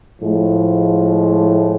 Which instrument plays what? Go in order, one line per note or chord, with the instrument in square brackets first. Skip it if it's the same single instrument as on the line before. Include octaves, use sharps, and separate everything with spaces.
[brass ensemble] A2 F3 G#3